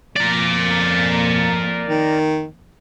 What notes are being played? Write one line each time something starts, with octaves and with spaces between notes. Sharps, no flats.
F2 A#3 A#4 D5
D#3